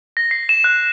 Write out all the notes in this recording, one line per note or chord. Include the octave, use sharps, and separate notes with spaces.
A#6
C7
E7
F#6